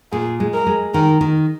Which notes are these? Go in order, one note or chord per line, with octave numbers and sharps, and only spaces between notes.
A#2 G#4
G#3
A#4
G#3
D#3 A#4
D#3